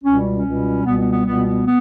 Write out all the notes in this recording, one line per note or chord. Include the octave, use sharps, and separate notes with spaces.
C#2 B2 G3 C#4
C#4
C#2 B2 G3
C#2 B2 G3 B3
B3
B3
C#2 B2 G3 B3
B3
B3